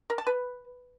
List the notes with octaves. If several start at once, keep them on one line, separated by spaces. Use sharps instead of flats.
A#4
A5
B4